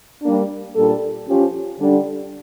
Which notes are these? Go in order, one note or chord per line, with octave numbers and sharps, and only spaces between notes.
G3 A#3 D4
A#2 G3 D4 A4
F3 C#4 G4
D3 G3 D4